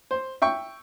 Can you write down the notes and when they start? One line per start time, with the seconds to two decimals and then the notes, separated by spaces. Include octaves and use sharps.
0.11 C5
0.42 E5 G5 C#6